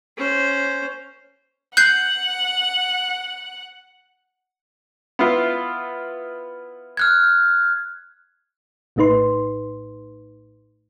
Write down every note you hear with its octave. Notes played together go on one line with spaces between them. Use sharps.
C#4 C5
F#5 F#6 G6 C7
B3 E4 F4
F6 F#6 G#6
A#1 A2 A3 D#4 B4 C6